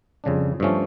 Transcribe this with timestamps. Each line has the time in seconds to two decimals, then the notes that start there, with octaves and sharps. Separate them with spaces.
0.24 F2 C#3 G3 D4
0.60 G2 F3 A3 C#4